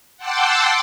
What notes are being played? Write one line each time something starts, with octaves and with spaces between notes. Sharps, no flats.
F#5 G5 A5 C6 D6 E6